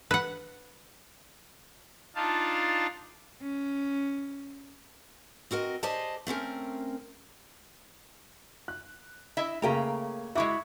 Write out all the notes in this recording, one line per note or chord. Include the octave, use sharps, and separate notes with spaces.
B4 F#5
D4 D#4 F4 F5 A5
C#4
C4 F#4 A#4 D#5
G4 G#4 C5 D5 D#5 A5
A3 C4 C#4 A#4
F#6
E4 D#5 E5
C#3 A3 A#3 G#4 G5 A#5
G#3 E4 F#4 E5 D6